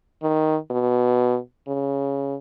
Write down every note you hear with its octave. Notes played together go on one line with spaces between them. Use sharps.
D#3
B2
C#3